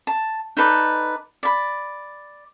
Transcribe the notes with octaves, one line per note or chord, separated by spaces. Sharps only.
A5
D#4 A4 B4 D5
D5 B5